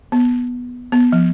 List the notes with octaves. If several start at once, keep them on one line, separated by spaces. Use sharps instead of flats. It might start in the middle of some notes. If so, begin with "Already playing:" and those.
B3
B3
F3